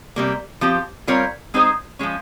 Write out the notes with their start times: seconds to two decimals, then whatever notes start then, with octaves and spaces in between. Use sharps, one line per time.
0.16 C3 G3 A#3
0.61 F3 C4 G4
1.07 G3 C4 F4 A#4 C#5
1.54 G#3 C4 D#4 G#4 C5
1.99 F3 G#3 C#4